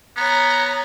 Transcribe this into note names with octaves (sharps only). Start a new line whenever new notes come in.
B3 C#5 A#5